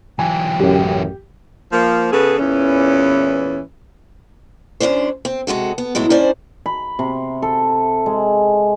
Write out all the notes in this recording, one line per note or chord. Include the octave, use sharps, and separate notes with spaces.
E3 F#3 G5 G#5
A1 F#2 G4
F3 A#3
C#3 B3 G#4 A4 B4
E2 A#2 E3 C#4
F#2 D#3 C#4 D4 C5
C4
C3 G#3 F#4 A4
B3
A2 F#3 G#3 E4
G#2 A#3 C#4 D4 C5 D5
B5
C3
A4
G#3